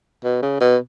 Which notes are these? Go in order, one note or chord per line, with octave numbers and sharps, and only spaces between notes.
B2
C#3
B2